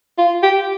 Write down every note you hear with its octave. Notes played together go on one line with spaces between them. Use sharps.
F4
G4